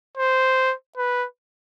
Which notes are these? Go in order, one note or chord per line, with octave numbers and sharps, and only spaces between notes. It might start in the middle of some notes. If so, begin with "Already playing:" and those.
C5
B4